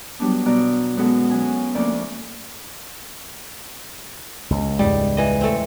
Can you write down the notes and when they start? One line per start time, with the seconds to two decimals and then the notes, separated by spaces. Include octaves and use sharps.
0.20 F#3 G3 B3 D4
0.46 B2 B3 D5 A#5 F#6
0.97 F#2 G#3 B3 A4 F#5
1.30 F#3 C#4 G#5
1.75 D2 F3 A#3 C#4 D5
4.50 C#2
4.79 E2 G#2 G3 G#3
5.17 E3 D#5
5.41 A3 C4